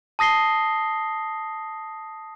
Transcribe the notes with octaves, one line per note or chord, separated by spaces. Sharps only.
A5 D#6 A#6 C7 G7